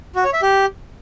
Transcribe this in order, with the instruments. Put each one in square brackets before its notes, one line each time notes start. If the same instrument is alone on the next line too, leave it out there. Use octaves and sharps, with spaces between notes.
[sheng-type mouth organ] F#4
C#5
E5
G4